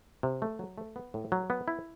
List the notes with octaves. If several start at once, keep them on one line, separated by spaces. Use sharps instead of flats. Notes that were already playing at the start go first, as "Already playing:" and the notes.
C3
A3
F#3
A3
B3
A2
F#3
B3
E4